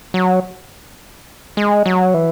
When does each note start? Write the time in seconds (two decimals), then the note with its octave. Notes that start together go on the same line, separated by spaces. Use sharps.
0.14 F#3
1.57 G#3
1.86 F#3
2.14 E3